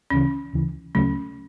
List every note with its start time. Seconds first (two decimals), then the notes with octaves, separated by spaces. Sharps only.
0.10 D2 C#3 E3 C#4
0.53 D2 C#3 E3
0.95 D2 C#3 F#3 A3 C#4